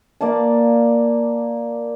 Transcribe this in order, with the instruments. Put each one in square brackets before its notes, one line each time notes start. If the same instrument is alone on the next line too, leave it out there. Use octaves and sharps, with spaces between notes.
[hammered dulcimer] A#3 D5 F5 A5